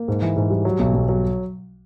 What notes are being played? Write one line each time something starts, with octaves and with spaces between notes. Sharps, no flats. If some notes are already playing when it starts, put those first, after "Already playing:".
Already playing: A#3
G#2
E3
G#2
G3
F#3
B1
B1
F#3